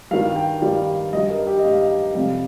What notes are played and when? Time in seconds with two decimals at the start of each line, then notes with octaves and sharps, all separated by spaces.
0.11 G2 D#3 G3 F5
0.36 G5
0.61 G2 D#3 G3 F5
1.13 G2 G3 D#5
1.30 A#4
1.47 G4
1.59 D#5
1.64 G2 G3 F5
2.15 F2 C3 G3 F5